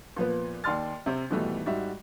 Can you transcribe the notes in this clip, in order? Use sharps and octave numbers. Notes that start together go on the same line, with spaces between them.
A#2 F3 B3 B4
D#2 D5 C6 F6 A6
C3 C4
G#2 B2 D#3 E3 G3 A3
G#2 G3 F#4 E5